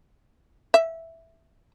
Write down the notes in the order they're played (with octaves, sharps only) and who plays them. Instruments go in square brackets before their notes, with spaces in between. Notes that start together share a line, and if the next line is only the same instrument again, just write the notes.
[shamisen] E5